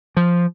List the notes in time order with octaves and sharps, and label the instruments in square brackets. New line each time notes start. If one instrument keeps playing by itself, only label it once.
[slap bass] F3